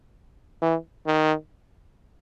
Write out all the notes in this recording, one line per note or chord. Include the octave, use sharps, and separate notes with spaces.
E3
D#3